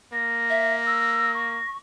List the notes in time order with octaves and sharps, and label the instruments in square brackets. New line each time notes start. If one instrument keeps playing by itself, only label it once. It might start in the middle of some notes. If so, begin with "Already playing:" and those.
[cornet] A#3 [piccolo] A#6
[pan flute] E5
E6
C#6